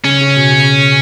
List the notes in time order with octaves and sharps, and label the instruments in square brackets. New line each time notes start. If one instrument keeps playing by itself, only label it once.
[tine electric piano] C#3 [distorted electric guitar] C#4
[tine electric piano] C#3
B2
C#3